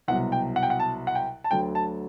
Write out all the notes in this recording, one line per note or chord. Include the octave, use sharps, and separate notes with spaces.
C2 B2 F#3 F#5
G5
F#5
G5
F#5
A5
F#5
G5
A5
D2 D3 F#3 G5
A5